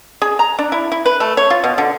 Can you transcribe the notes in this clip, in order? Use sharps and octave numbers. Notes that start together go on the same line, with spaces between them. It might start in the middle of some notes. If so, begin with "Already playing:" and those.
G#4
A#5
D4
E4
E4
B4
A3
C#5
F4
B2
D3